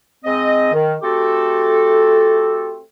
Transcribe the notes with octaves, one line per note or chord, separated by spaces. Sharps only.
G#2 C4 D#5
D#3
A3 C4 F#4 G4 A4